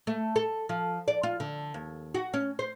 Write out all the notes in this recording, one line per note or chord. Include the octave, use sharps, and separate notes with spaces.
A3
A4
F3
D5
F4
D3
D#2
F#4
C#4
C5